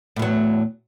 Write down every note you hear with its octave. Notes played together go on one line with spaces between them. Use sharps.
E2 A2 F#3